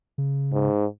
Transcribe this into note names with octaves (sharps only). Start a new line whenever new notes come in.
C#3
G#2